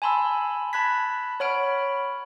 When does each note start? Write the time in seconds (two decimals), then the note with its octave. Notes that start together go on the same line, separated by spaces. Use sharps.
0.02 G#5 A5 B5 C6 E6
0.73 A5 B5 F#6 G#6 B6
1.40 C#5 F#5 B5 F6 D7